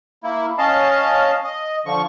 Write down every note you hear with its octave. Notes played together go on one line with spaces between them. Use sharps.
A#3 E4
C#4 D#5 F5 A5
D#5
D3 F3 C#6